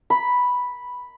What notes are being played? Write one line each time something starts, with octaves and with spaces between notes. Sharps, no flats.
B5